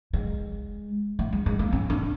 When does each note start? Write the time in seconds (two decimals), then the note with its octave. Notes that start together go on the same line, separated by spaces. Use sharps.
0.13 G#3
1.19 A3
1.33 G#3
1.46 G#3
1.59 A#3
1.73 C#4
1.90 D4